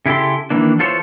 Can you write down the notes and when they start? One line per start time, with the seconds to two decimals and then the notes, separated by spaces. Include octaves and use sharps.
0.06 C#3 E4 G4 A4 C6
0.50 D#3 E3 A#3 D4
0.79 E3 F4 A4 C5 C#5